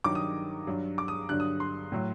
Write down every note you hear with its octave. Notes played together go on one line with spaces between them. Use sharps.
G2 D#3 F#3 D6
D#6
G2 F#3
D6
D#6
G2 D3 F#3 F#6
D#6
C6
A2 F#3